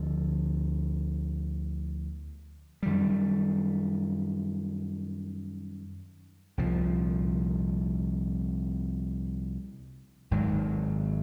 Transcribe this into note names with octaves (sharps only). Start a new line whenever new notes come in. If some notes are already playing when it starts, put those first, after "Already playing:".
Already playing: D2 D3 F3
F#2 D#3 G3
C2 A#2 F3
G#1 G#2 D#3 F#3